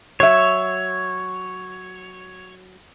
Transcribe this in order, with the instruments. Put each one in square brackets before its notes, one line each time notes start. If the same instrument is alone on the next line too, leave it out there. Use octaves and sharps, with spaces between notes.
[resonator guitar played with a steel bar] F#3 E5 [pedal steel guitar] C#5